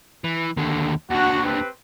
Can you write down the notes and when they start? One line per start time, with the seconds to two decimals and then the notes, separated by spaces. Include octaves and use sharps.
0.24 E3
0.57 D#2 D3
1.10 D#2 D3 F#4
1.45 C4 G4 B4